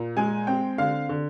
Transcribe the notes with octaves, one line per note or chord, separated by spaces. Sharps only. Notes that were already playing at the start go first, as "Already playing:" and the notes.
Already playing: A#2
G#3 G#5
C4 G5
D3 F5
D3